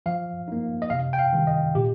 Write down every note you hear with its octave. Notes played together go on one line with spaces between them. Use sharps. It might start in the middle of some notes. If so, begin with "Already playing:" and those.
F3 F5
A#3 D#4
D#5
C3 F5
G5
F5
D#3 G3
D#5
A#2 G4